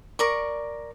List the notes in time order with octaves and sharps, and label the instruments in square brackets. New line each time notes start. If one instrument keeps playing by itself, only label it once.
[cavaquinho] A#4 D5 C#6